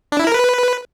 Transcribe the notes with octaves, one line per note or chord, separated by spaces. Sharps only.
D4
E4
A#4
B4